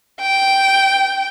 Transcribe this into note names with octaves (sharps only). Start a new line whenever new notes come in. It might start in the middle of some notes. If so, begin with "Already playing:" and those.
G5